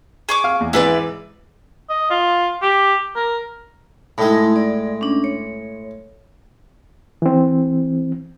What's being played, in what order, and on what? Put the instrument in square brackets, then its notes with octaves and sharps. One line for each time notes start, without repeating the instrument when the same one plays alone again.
[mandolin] G#4 C#6 D6
[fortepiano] F5
E2
[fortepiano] G#2 E3 G#3 [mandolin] E4 B4 D5
[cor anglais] D#5
F4
G4
A#4
[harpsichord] A2 G#3 [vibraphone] A3 D#4 E4
[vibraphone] D5
C#4 D4
C#5
[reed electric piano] E3 C4